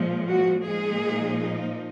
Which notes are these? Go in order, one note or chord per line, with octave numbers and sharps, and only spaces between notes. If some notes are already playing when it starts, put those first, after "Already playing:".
Already playing: A#2 F3 G#3
F#4
A#2 F3 G#3 A#3 D#4 G#4